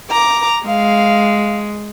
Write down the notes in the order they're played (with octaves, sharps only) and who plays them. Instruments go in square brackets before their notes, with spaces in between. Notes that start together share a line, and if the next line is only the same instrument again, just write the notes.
[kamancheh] A#5 D6
[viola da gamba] G#3 [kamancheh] F5